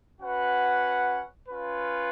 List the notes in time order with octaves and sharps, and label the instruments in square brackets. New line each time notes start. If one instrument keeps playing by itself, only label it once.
[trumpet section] C#4 F#4 B4 F#5
C#4 F4 B4